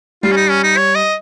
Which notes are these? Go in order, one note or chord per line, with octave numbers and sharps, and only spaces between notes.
G3 F4
C#4
D#4
C#4
D#4
C#5
D#5